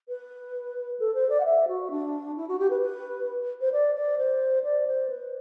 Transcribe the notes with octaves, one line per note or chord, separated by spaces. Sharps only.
B4
A4
C5
D5
F#5
E5
F#4
D4
E4
F#4
G4
B4
B4
C5
D5
D5
C5
D5
C5
B4